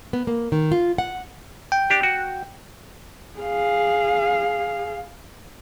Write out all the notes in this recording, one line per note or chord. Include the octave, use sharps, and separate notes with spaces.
B3
A#3
D#3
F4
F#5
G5
D4 G4
F#4
G#4 F5